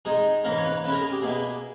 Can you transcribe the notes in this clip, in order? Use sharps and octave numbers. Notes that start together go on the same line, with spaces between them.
D#3 G#3 D#4 G#4
G#2 E3 A#3 C#4 A#4
C#5
B4
C#3 G#3 C#4 E4 B4
A#4
G#4
G4
B2 A#3 E4 G#4